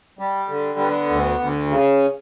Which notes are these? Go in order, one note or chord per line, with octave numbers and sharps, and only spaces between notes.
G3
D3
B3
D2
D2
C#3